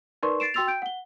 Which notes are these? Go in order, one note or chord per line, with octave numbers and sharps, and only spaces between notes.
D#4 A#4 B4 D5 C6 C#6
A6 C7 D7 E7
F#4 G5 C6 E6 A6 F7
G5 G6 D7
F#5 G7